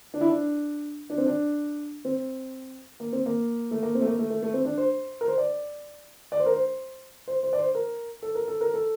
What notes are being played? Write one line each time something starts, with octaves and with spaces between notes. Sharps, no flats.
D4
E4
D4
D4
C4
D4
C4
A#3
C4
A#3
A3
A#3
C4
A3
A#3
A3
A3
A3
C4
D4
C5
A#4
C5
D5
D5
C5
A#4
C5
C5
C5
D5
C5
A#4
A4
A#4
A4
A#4
A4